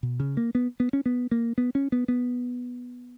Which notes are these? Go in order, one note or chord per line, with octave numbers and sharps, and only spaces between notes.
B2
C#3
A#3
B3
B3
C#4
B3
A#3
B3
C#4
B3
B3